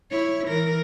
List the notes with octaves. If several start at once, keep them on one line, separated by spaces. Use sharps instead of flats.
E4 C#5
E3 A#4